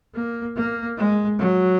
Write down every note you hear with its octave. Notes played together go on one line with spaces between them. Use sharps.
A#3
A#3
G#3
F#3